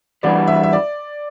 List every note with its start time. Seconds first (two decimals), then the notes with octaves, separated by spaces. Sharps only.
0.23 E3 G3 D4 F#4 B4 D5
0.47 E5
0.63 E5
0.73 D5